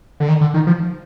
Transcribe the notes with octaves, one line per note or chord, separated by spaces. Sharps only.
D3
D#3
D3
D#3
F3